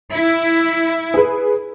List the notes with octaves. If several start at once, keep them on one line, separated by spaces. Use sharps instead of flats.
E4
G#4 B4